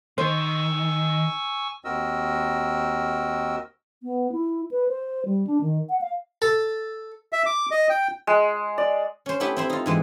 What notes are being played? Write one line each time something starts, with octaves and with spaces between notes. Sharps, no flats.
D#3 C5 G#5 C#6 E6
D#2 C4 F#4 A#4 D#5 E6
B3
E4
B4
C5
G3
D4
D#3
F#5
F5
A4
E5
D6
D#5
G5
G#3
D5
C#4 C5
A3 B3 E4 G4 C6
C4 E4 C5
D#4 F4
G#2 E3 G#3